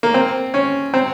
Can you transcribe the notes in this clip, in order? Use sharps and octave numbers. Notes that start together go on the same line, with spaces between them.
A#3
C4
C#4
C4